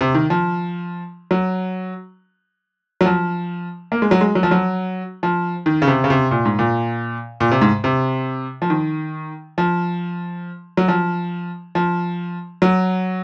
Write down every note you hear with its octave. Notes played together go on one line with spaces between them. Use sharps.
C3
D#3
F3
F#3
F#3
F3
A#3
G#3
F#3
G#3
F#3
F3
F#3
F3
D#3
C#3
C3
C#3
C3
A#2
G#2
A#2
A#2
C3
G#2
C3
F3
D#3
F3
F#3
F3
F3
F#3